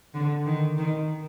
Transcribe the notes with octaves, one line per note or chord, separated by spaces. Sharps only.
D3
D#3
D#3